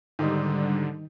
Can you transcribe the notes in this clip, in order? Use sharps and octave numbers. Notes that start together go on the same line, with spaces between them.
G#2 D3 D#3 G3 D#4